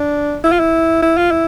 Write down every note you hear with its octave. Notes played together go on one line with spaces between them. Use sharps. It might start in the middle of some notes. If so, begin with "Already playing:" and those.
Already playing: D4
E4
F4
E4
E4
F4
E4